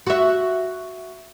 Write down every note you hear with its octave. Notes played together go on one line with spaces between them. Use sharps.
F#4 E5